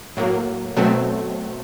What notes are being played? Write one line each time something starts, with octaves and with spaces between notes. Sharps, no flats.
A2 F#3 A#3
B2 F#3 A3 C4